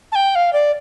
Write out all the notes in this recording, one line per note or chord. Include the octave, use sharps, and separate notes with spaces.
A5
G5
F5
D5